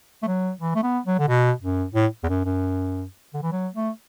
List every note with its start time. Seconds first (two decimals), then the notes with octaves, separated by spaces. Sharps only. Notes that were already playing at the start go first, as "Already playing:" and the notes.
0.23 A3
0.27 F#3
0.61 E3
0.75 A3
0.83 B3
1.06 F#3
1.19 D3
1.28 B2
1.62 F#2
1.95 A2
2.24 E2
2.29 F#2
2.45 F#2
3.34 D3
3.42 E3
3.52 F#3
3.74 A3